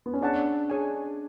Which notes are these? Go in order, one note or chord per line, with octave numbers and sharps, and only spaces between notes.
B3
C#4
D4 G#4 C#5 F#5 A5
D4 G#4 C#5 G#5